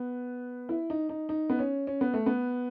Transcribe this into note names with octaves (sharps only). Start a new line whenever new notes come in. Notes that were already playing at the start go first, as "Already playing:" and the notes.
Already playing: B3
E4
D#4
D#4
D#4
B3
C#4
C#4
B3
A3
B3